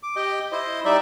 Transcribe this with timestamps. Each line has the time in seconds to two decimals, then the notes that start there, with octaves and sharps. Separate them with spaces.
0.03 D6
0.16 G4 D#5 G5
0.52 E4 C5 D#5
0.85 G3 D#4 D5 E5